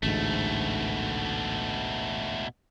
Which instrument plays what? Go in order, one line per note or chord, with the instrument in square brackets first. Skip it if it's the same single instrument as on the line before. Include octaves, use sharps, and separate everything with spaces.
[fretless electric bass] A1 D2 G#2 [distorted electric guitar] B2 A3